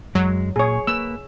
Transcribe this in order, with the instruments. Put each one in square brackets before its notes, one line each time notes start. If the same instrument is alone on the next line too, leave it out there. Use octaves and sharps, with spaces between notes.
[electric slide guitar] F#2 G#3 [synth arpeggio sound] F#3
[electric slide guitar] A#2 [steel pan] G#4 C#5
[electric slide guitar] A#3 B4 [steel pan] E6